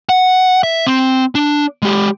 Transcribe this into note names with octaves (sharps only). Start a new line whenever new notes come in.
F#5
E5
C4
D4
G#3 G4